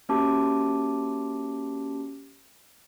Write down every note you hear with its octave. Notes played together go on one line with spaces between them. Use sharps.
A#3 C#4 F#4 G4 A5 D6